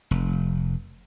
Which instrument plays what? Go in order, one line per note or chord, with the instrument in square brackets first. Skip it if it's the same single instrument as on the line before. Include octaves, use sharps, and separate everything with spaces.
[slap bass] F1